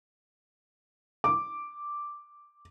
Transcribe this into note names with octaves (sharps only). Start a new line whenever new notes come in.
D6